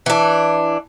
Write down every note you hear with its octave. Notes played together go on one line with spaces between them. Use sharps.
E3 D4